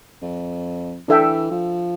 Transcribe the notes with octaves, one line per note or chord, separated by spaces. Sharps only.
F2
E3 D4 A4 E5 G5
F3